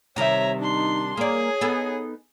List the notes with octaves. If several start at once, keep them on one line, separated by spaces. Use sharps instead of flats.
C3 D#3 G3 C#5 E5 A#5
D4 D#4 C6
A#3 G#4 C#5 D5
B3 D#4 A4